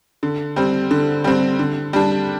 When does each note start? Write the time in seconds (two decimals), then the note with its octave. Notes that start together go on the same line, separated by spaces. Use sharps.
0.23 D3
0.56 G3 C4
0.91 D3
1.24 G3 C4
1.59 D3
1.93 G3 D4